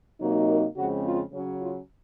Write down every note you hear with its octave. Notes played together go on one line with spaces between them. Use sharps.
C3 F#3 A#3 D#4
A#4
F2 C#3 G#3 C4 F#4
F4
C#3 F#3 C#4
F4